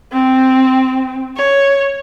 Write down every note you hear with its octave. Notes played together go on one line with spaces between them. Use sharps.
C4
C#5